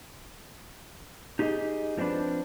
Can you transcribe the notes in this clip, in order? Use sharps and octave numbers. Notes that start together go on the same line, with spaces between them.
D#4 G4 G#4 C#5 D#5
F3 A#3 C4 D4 B4